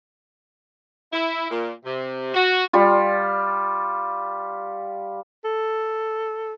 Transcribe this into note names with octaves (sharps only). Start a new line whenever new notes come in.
E4
A#2
C3
F#4
G3 F4
A4